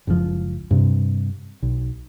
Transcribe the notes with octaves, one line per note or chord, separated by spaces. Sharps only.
F#1 C#2 B2 F3
G2 C3
B1